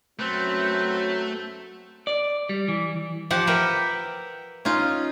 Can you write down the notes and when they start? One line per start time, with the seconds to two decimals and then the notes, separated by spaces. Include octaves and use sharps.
0.19 F#2 F#3 A3 C4 B4 G6
2.07 D5
2.49 G3
2.68 E3
3.31 F3 G4 F#5
3.47 A#4 B4 E5 F#5 G5
4.65 C#4 D#4 F4